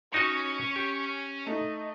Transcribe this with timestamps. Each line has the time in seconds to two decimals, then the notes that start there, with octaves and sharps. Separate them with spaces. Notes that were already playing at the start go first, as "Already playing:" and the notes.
0.14 C#4 D#4 F#4 C#5 D#5 C#6
0.76 G4
1.46 A3 D#4 D#5